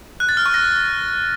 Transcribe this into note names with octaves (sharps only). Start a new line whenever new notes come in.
F#6
A6
F6
C#6
A#6